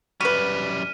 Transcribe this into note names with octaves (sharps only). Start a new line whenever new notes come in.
F#2 G3 F#4 B4 F6 B6 D#7